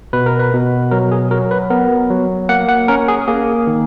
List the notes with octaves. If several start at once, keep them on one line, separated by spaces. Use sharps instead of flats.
B2 B4
A#4
B4
B2
F#3 A#4
G#4
F#3 A#4
B4
B3 A#4
F#3
A#3 F#5
F#5
C#4 A#4
G#4
A#3 G#4
D#3